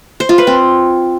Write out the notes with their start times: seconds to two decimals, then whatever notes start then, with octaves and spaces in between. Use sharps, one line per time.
0.20 C5
0.29 F4
0.38 B4
0.47 C4